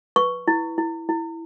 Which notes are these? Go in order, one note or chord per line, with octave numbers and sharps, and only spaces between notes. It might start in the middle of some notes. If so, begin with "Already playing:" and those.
B4 C#6
E4
E4
E4